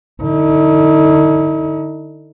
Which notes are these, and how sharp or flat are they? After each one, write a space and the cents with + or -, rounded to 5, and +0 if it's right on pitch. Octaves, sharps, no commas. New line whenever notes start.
D3 +35 D#4 +45